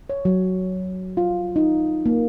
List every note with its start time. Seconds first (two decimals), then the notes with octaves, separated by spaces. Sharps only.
0.10 C#5
0.25 F#3
1.17 F4
1.56 D#4
2.06 A#3